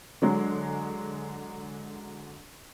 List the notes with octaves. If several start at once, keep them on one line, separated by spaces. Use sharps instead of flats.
D3 F#3 G#3